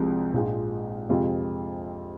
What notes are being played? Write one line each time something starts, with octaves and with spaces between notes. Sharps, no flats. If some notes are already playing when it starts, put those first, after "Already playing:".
Already playing: C2 C3 F3 G#3 C4
A#1 G#2 G#3 F4
F2 C3 G#3 C4 F4